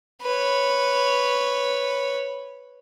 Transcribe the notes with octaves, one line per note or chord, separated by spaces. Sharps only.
B4 C#5